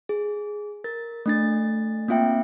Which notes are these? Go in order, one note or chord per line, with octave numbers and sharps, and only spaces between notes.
G#4
A#4 A6
A3 D4 A6
A#3 C4 F4 E5 G5